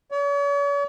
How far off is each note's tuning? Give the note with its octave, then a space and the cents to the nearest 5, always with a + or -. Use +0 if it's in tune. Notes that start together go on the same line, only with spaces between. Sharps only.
C#5 +45